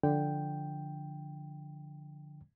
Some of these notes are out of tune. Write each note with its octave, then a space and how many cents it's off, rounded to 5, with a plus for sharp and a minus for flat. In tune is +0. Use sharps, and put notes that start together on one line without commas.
D3 +0 F3 +0 G5 +0